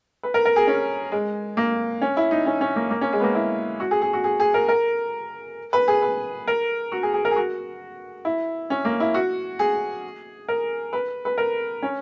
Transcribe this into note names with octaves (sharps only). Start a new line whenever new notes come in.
B4
A#4
A#4
G#4
C#4
G#3
A#3
C#4
E4
D#4
C#4
C#4
A#3
A#3
C#4
G#3
B3
A#3
E4
F#4
G#4
G#4
F#4
G#4
G#4
A#4
A#4
B4
G#4
B4
A#4
F#4
G#4
G#4
A#4
G#4
F#4
E4
C#4
A#3
E4
F#4
G#4
A#4
B4
B4
A#4
C#4